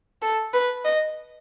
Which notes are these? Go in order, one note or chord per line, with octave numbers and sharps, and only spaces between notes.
A4
B4
D#5